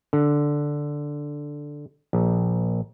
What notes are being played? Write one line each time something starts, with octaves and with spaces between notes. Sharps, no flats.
D3
A#1